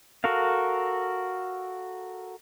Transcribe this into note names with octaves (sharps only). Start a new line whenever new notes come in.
F#4 A4 A#4 F5